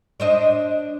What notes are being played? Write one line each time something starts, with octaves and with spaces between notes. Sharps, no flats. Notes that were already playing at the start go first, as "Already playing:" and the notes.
D4 C5 D#5